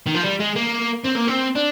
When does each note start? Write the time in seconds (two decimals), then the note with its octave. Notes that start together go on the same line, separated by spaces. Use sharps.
0.07 D#3
0.15 F3
0.23 G3
0.40 G#3
0.56 A#3
1.05 C4
1.16 A#3
1.28 C4
1.55 D4